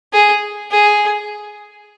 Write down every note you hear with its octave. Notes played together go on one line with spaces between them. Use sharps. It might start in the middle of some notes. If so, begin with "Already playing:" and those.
G#4
G#4